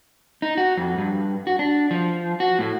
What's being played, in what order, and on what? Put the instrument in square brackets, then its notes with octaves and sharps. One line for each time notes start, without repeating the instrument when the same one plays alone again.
[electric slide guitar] D#4
F#4
F2
G2
F#4
D4
F3
F#4
A2